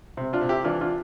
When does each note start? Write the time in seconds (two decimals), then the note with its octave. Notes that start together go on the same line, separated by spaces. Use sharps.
0.17 C3
0.33 D4 F4
0.41 C3
0.49 E4 G4
0.64 E3 D4 F4
0.81 D4 F4